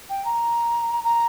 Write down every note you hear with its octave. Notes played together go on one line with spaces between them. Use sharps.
G5
A#5
A#5